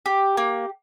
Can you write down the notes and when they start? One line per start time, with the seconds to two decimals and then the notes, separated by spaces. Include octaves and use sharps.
0.06 G4
0.37 A#3